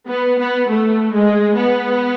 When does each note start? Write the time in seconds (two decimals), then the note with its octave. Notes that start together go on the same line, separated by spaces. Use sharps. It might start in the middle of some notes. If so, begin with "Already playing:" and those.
0.09 B3
0.39 B3
0.69 A3
1.14 G#3
1.58 B3